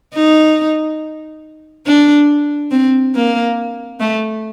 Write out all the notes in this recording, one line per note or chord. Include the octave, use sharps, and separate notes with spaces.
D#4
D4
C4
A#3
A3